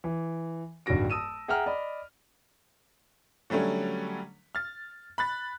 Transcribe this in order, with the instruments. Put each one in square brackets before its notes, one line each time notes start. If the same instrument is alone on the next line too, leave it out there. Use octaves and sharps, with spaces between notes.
[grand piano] E3
D1 G2 D#3 F#4 A#6 D7
A5 D#6 E6 D#7 E7
G#4 E5 F#5 G5 A#5 F6
D5 D#5 B5
[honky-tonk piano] D3 F#3 G3 A3 C#4
F6 A6
B5 F#6 A6